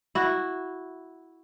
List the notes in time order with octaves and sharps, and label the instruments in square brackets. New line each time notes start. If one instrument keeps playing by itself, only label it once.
[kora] E4 F#4